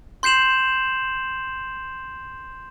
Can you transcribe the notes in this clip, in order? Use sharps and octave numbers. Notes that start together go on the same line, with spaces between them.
C6 G6 C7 E7 F#7